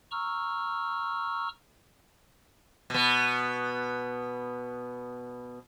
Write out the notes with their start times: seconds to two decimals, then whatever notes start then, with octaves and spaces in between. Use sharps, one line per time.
0.11 A#5 C#6 E6 F6
2.90 B2 B3